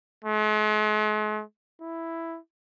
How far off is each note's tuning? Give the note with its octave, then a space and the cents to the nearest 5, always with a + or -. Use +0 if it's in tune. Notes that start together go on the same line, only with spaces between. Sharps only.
G#3 +45
E4 +5